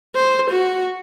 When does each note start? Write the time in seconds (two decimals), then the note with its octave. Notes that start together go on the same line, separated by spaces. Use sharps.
0.16 C5
0.51 F#4